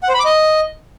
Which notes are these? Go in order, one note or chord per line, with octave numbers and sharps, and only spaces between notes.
F#5
C5
B5
D6
D#5